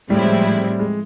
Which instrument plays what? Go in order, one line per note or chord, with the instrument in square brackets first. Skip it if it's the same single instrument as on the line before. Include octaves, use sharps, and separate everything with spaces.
[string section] A2 F3 G#3 C4 E4 [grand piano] G3
[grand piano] G#3